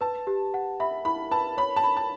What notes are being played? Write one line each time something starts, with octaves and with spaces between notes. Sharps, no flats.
B4 A5
G4
F#5
E5 B5
E4 B5
B4 A5
C#5 B5
A5
B5
A5